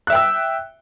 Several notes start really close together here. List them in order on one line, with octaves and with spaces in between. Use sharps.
F#6 E5 G5 E6